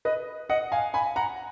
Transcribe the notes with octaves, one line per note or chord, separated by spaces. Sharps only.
B4 D#5
D#5 F#5
F5 G#5
G#5 B5
F#5 A#5